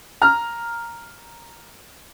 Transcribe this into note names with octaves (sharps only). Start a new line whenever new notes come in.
A#5 F6